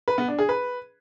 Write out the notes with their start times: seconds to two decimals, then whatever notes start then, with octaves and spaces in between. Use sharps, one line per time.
0.08 B4
0.18 B3
0.28 D4
0.39 G#4
0.49 B4